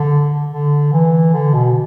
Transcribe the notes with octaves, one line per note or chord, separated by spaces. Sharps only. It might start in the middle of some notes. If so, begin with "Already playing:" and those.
Already playing: D3
D3
E3
D3
B2